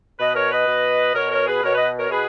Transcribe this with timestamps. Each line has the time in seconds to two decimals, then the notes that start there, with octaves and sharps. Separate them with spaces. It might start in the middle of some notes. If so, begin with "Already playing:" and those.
0.19 B2 B4 D#5
0.35 A#4 C#5
0.51 B4 D#5
0.67 B2
1.14 B2 A#4 C#5
1.31 A#4 C#5
1.47 G#4 B4
1.62 B2 A#4 C#5
1.75 B4 D#5
1.98 A#4 C#5
2.10 B2 G#4 B4